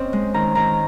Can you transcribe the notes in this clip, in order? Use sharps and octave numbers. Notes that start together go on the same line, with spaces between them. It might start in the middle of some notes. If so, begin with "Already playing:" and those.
Already playing: C4 C#4 D#5
G#3
D#3 A#5
D#3 A#5